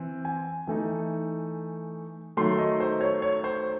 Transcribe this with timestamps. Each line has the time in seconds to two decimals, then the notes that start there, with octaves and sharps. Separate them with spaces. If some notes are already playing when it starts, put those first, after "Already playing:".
Already playing: E3 C4
0.25 G#5
0.67 E3 A3 D#4
2.37 D#3 F#3 A3 C6
2.58 D#5
2.80 C5
3.01 C#5
3.22 C#5
3.44 C5